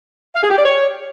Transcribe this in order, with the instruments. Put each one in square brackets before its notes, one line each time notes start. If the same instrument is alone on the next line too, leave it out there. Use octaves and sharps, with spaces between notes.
[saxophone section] F5
G#4
G4
D5
C#5